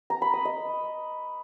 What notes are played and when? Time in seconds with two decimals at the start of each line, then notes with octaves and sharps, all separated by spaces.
0.10 A#5
0.22 B5
0.33 D#6
0.45 D#5